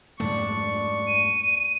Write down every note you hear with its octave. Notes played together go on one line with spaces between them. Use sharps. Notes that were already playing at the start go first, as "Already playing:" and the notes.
F2 G#2 A3 D4 C#6
D#7